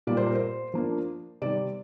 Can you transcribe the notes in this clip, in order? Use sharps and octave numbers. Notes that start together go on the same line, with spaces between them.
A#2 G3 A#3 D5
C5
A#4
C5
F3 A#3 D4
C3 D#3 G3 D5